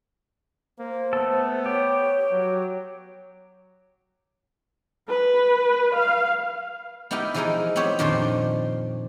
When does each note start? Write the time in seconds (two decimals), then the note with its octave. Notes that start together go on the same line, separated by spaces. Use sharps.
0.79 A#3 C5
1.13 A3 B3 A4
1.66 G4 C#5
2.31 F#3
5.09 B4
5.95 F5
7.11 B3 D#4 E4 G4 A#4
7.34 E3 F3 G#3 D#4 G#4 A#4
7.76 B3 C4 G4 C#5
7.99 F2 A#2 D#3 D4 C5 C6